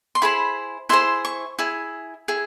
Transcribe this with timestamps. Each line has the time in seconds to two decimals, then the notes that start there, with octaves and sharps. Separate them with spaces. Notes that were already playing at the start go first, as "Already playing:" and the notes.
0.15 C6
0.22 E4 G#4 C5 B5
0.89 E4 G#4 C5 C6
1.25 C#6
1.59 E4 G#4
2.28 E4 G#4